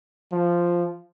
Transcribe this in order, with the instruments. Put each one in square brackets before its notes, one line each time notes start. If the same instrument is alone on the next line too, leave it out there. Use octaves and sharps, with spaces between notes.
[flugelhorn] F3